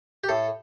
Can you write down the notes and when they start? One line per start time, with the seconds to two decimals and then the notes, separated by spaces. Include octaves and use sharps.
0.24 G4
0.29 A2 A4